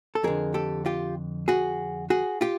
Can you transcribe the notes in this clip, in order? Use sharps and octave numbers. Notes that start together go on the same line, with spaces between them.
A4
F2 D3 G#4 A#4
G4 A4
F4 G4
F#4 G#4
F#4 G#4
F4 G4